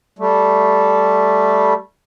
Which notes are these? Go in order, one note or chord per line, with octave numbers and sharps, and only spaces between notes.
G3 A3